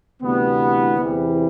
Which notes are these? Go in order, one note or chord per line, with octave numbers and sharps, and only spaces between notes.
D2 C3 E3 G3 B3
E2 C3 E3 G3